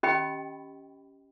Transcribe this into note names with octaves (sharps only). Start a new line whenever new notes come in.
C#4 G4 D#5 G5 B5